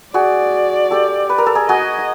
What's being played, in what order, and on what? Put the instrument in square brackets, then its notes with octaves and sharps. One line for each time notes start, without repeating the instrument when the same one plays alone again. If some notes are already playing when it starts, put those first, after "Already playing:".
[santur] F#4 G#4 [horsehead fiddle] D5
[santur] G4 A4
B4
A#4
A4
G#4 A#4
[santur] F#4 G#4 [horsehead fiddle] D#5